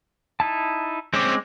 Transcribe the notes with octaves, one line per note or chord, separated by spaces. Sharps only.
D#4 E4 A5
G#3 C4 C#4 D6